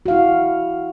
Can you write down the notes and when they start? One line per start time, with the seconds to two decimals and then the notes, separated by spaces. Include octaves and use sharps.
0.06 F#4
0.08 F5
0.11 E4